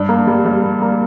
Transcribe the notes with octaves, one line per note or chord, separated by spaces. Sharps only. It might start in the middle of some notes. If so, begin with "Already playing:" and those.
Already playing: G2
A#3
G3
G3
A#3
A#3